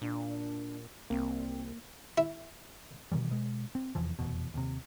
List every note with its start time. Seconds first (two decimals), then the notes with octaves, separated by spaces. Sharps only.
0.01 A#2 D4
1.10 C2 A#3 C4
2.18 E4
3.12 B2 D#3 E3 G3
3.31 B2 G#3
3.75 C4
3.95 F1 E2 E3 F3
4.19 F1 E2 B2
4.54 D#2 C3